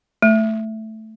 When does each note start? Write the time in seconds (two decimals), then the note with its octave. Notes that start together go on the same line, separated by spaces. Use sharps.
0.22 A3